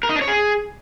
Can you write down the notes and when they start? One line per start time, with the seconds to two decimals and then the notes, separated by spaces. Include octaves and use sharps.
0.03 A#4
0.09 D#4
0.15 D4
0.22 C#5
0.28 G#4